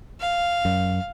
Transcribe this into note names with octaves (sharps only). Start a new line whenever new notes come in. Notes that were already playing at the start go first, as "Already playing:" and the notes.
F5
F#2